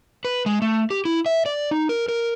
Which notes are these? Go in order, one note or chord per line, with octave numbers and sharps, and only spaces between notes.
B4
G#3
A3
G4
E4
E5
D5
D#4
A#4
A#4